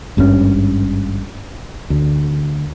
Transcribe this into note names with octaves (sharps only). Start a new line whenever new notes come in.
G#1 G2 A#2 C#4
D2